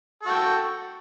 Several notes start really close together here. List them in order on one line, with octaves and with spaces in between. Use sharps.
A4 F#4 G5